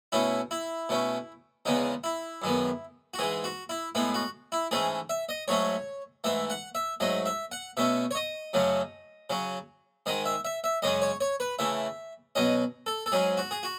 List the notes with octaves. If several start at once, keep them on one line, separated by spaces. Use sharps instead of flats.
B2 A3 C#4 E4
E4
B2 A3 C#4
E2 C#3 G#3 B3 D#4
E4
F#2 D#3 G#3 B3
F#4
G#2 E3 G#3 G#4
F#4
E4
A2 G#3 B3 E4
F#4
E4
G#2 E3 A3 C#4 G#4
E5
D#5
G#2 F#3 A3 C#4 C#5
G#2 E3 A3 E5
F#5
E5
G#2 F#3 A3 D#5
E5
F#5
B2 A3 C#4 E5
C#5
D#5
F#2 C#3 F#3 A3 C#4
C#3 F#3 C#4
G#2 D#3 G#3 D#5
E5
E5
E5
F#2 C#3 G#3 C#4 D#5
C#5
C#5
B4
C#3 E3 A3 E5
B2 F#3 C#4 D#5
A4
A4
G#2 F#3 C#4 G#4
F#4
G#4
F#4